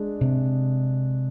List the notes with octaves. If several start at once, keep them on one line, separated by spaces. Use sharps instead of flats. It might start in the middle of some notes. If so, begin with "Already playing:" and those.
Already playing: G#3 D4 G#4
C3